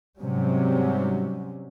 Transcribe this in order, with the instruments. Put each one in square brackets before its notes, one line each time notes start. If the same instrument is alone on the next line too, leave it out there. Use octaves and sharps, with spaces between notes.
[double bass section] G#2 C3 F#3 G3 C#4